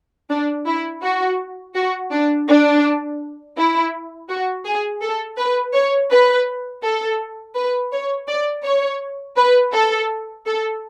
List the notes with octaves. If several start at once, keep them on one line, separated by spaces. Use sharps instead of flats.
D4
E4
F#4
F#4
D4
D4
E4
F#4
G#4
A4
B4
C#5
B4
A4
B4
C#5
D5
C#5
B4
A4
A4